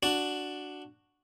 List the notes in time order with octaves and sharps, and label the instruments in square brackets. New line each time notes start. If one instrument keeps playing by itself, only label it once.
[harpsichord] D4 F#4